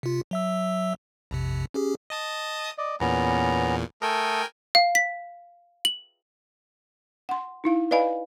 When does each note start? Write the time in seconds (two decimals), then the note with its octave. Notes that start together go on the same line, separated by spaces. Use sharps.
0.03 C3 F4
0.31 F#3 E5 E6
1.31 A#1 F2 C3
1.74 C#4 G4 G#4
2.10 D#5 A5 D#6
2.78 D5 D#5
3.00 E2 A#2 B3 C#4 A#5
4.02 A3 A4 A#4 G5 G#5 D#6
4.75 F5
4.95 B6
5.85 F#7
7.29 F#5 C6
7.64 D#4 E4 F5
7.91 B4 D5 D#5 F5 G#5 B5